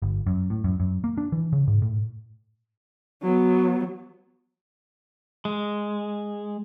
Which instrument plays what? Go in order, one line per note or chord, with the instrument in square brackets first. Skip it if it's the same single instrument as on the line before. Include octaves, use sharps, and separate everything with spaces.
[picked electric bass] G1
F#2
A2
F#2
F#2
A#3
D4
E3
C#3
G#2
A2
[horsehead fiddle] F#3 B3
[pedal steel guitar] G#3